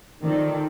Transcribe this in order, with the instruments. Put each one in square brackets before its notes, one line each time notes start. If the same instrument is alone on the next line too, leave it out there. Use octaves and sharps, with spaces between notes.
[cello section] D#3 [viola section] C4 F4 A4 D5